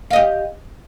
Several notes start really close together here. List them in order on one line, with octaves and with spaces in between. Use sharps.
F5 D#5 G4